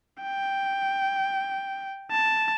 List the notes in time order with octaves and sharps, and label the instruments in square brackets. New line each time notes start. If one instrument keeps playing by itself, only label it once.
[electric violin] G5
A5